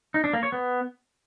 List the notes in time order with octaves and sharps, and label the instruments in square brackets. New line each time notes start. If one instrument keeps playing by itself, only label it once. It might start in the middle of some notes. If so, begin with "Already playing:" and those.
[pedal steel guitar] D#4
D4
A#3
C#5
B3